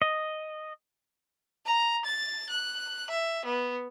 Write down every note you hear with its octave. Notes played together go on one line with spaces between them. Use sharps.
D#5
A#5
A6
F#6
E5
B3